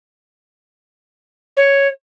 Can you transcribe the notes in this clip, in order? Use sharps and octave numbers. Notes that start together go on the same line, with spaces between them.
C#5